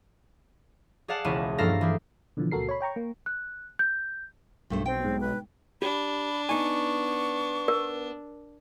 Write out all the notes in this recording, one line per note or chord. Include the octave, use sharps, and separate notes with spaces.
G#4 D5 F5 F#5 A5
E1 C#2 C#4 E4 D#7
G2 F3 A#3 A4 F5 A#6
E3 G4 G#4
B2 D3 E3 F3
C#2 A#2 F#4 A4 A#4 C7
C#5 B5
C#5 G5 A#5 C#6
A#3
F#6
G6
B1 G2 A3 C5
C4 G5
G#2 B2
B4
D4 G4 B5
B3 D#4 G#5 C#6
A#4